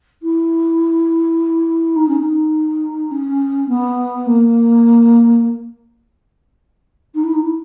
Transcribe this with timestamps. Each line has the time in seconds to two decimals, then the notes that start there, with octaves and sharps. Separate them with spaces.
0.23 E4
1.96 D#4
2.08 C#4
2.20 D#4
3.11 C#4
3.68 B3
4.26 A#3
7.14 D#4
7.23 E4
7.33 D#4
7.42 E4